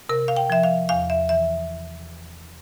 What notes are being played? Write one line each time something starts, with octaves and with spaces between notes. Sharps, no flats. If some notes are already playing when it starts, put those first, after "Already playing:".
C3 A#4
F5
G5
F3 E5
F5
E2 F5
E5
E3 E5